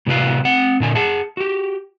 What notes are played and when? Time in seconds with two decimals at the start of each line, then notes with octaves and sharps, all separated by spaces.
0.07 A2 C3 F#4 G4 B4 F5
0.45 C4 F#5
0.80 A#2 D3 G#5
0.95 G#4 F#5 A5
1.37 F#4 G4